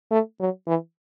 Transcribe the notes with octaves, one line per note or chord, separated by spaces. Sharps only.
A3
F#3
E3